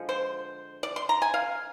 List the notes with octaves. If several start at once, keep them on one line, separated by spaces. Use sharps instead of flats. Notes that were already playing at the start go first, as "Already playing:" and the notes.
Already playing: D3 F3 G#3
C5
D5
C6
A#5
G#5
F5